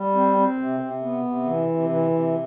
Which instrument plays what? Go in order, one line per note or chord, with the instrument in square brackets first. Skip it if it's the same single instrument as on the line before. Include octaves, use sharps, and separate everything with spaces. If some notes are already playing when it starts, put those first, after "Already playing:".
Already playing: [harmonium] G3
C4
C4
C3
C3
B3
C3
E3
C3
E3
C3